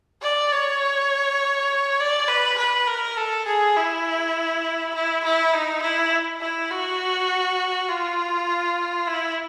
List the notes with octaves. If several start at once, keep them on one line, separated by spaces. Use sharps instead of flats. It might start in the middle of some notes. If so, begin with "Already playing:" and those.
D5
C#5
D5
B4
B4
A#4
A4
G#4
E4
E4
E4
D#4
E4
E4
F#4
F4
E4